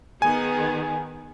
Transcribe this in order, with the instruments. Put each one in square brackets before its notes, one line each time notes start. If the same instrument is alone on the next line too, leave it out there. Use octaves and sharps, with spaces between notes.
[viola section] D#3 B3 G#4 [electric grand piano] G#5